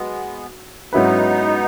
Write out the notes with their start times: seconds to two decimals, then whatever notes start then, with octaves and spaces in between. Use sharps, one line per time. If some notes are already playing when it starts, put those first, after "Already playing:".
Already playing: F#3 G#3 B3
0.93 G#2 F#3 B3 C#4 D#4 E4 B4